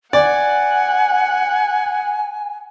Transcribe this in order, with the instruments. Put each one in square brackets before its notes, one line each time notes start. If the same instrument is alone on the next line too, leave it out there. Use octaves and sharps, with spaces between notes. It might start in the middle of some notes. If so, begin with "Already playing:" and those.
[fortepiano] D5 [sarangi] F#5 [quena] G#5